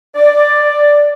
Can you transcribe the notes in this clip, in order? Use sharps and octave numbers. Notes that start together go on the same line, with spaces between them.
D5